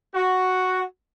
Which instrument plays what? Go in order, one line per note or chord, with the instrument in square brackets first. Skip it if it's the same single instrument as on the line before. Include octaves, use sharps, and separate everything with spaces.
[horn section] F#4